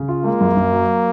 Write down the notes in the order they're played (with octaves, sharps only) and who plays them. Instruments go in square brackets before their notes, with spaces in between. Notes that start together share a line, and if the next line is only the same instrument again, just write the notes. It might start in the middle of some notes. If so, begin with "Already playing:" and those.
Already playing: [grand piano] C#3
F4
[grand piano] G#3 [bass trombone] A#3
[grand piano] F#2
F#2
F#3